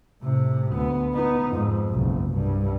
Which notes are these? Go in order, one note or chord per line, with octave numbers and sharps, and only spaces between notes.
A2 C3
D2 B3
B3 D#4
F2 G#2
F#1 B1
C2 G2